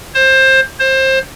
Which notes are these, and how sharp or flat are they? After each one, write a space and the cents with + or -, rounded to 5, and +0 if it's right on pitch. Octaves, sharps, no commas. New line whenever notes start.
C5 +20
C5 +25